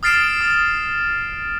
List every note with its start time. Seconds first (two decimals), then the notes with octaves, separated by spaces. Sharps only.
0.03 D#6 F6 A6 C7 D7 E7
0.41 D#6